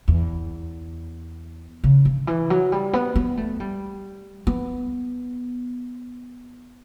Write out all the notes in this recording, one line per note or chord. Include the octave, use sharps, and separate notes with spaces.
E2
C#3
D3
E3
F#3
G3
B3
B3
A3
G3
B3